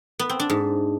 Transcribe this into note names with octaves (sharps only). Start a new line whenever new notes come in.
B3
C4
D4
G#2